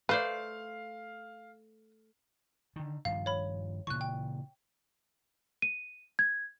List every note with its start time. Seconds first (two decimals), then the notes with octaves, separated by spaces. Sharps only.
0.09 A3 B4 C5 D5 F5
2.76 D3 D#3
3.05 G2 D#3 F3 F5
3.26 C#5 B5
3.87 A#2 C#3 E3 C#6 F#6
4.01 G5
5.62 D#7
6.19 G#6